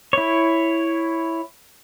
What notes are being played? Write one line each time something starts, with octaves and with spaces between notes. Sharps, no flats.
E4 C#5